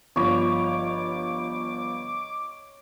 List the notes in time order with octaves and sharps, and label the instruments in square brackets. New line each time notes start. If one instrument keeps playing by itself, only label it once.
[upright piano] G1 F3 [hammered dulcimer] C#5 D#5 B5 [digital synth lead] D6